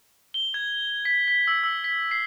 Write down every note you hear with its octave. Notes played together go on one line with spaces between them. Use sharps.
G7
G#6
B6
B6
E6
E6
B6
C7